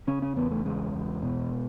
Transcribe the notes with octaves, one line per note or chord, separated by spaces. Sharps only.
C#3 C#4
C#4
E2 B3
A3
C#3 G#3
E2
B2